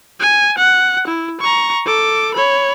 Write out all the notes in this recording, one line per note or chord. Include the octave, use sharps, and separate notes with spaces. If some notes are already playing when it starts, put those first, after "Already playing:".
G#5
F#5
E4
A#5 C#6
A4 D6
C#5 B5